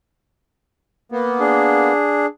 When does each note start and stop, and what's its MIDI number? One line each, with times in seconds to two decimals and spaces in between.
1.12 1.92 58
1.12 1.92 59
1.40 2.26 62
1.40 2.26 68